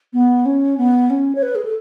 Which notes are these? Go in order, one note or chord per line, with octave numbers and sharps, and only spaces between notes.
B3
C#4
B3
C#4
C#5
B4
G#4
A4